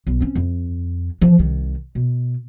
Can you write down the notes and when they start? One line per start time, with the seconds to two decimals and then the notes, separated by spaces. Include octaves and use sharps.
0.07 B1
0.21 C4 C#4
0.35 F2
1.21 E3 F3
1.38 C2 D#3
1.95 B2